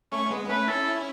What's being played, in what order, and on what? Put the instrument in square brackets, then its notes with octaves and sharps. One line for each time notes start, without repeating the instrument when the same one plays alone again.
[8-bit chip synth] A3 C#4 [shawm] C#6
[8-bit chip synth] C#4
G#3 B3
B3
[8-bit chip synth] A3 C#4 [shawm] B4
[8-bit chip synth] C#4 E4 [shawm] A4